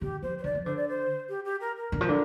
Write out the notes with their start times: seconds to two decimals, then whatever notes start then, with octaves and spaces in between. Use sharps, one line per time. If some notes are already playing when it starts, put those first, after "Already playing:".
0.01 D3 G4
0.22 F3 C5
0.38 C5
0.44 D3 D5
0.55 F3
0.65 D3 C5
0.77 D5
0.89 C5
1.29 G4
1.45 G4
1.61 A#4
1.77 A#4
1.92 D3
2.01 F3
2.09 D3